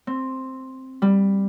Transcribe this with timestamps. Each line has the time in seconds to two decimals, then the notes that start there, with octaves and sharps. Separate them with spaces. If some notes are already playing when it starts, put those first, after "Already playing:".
0.07 C4
1.02 G3